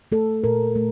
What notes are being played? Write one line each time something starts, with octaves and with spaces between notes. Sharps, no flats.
A3 A4
A#2 A#4
A3